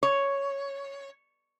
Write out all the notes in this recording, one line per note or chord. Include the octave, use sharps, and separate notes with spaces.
C#5